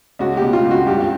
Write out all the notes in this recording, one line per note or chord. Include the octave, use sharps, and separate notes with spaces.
C#2 F#4
B2 G4
F4
C#2
F#4
G2 G4